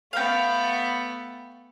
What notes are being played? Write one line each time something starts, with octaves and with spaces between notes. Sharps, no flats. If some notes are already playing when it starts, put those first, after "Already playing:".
A3 B3 F5 G5